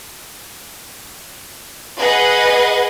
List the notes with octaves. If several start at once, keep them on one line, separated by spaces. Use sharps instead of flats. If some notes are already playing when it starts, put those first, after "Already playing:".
G#4 B4 D#5 F#5